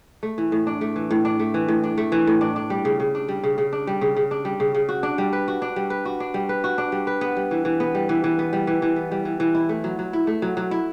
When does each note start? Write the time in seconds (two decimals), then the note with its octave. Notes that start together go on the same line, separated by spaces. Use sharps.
0.23 A3
0.38 E3
0.52 A2
0.67 D4
0.81 A3
0.96 E3
1.11 A2
1.25 D4
1.39 A3
1.54 E3
1.68 A2
1.84 D4
1.98 A3
2.12 E3
2.27 A2
2.41 D4
2.56 D4
2.70 G3
2.85 C#3
3.00 C#3
3.15 D4
3.28 G3
3.43 C#3
3.58 C#3
3.73 D4
3.87 G3
4.01 C#3
4.16 C#3
4.31 D4
4.45 G3
4.60 C#3
4.74 C#3
4.89 F#4
5.03 D4
5.18 G3
5.33 B4
5.48 F#4
5.62 D4
5.76 G3
5.90 B4
6.05 F#4
6.20 D4
6.34 G3
6.49 B4
6.64 F#4
6.78 D4
6.92 G3
7.07 B4
7.21 B3
7.36 G3
7.51 E3
7.65 E3
7.80 B3
7.95 G3
8.09 E3
8.24 E3
8.39 B3
8.53 G3
8.67 E3
8.82 E3
8.96 B3
9.11 G3
9.25 E3
9.40 E3
9.55 E4
9.69 A3
9.84 F#3
9.99 F#3
10.13 E4
10.27 A3
10.42 F#3
10.57 F#3
10.71 E4